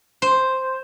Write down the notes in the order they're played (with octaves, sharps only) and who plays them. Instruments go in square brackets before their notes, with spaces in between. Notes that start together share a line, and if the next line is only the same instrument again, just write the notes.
[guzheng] C5